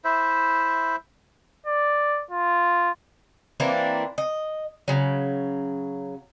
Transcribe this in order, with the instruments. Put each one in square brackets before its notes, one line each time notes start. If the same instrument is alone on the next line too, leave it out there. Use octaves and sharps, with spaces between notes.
[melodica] E4 C5 E5
[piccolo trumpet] D5
F4
[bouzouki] E3 A#3 C4 D4
D#5
C#3 F#3